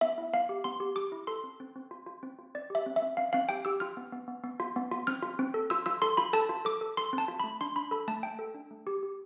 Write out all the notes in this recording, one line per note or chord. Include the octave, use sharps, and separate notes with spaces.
B3 E5
E4
B3 F5
G4
B3 C6
G4
G4 D6
E4
A4 C6
C4
C4
C4
F4
F4
C4
F4
C4 D5
G4 E5
C4
E5
C4
C4 F5
C4 F5
G4 G5
G4 E6
F4 F6
B3
B3
B3
B3
F4
B3
F4
C4 F6
F4
C4
A4
F4 E6
F4 E6
A4 C6
F4 B5
A4 A5
F4
A4 D6
A4
A4 C6
C4
A5
F4
A3 B5
D4 C6
D4 B5
A4 B5
A3 A5
A3 G5
A4
D4
A3
G4
G4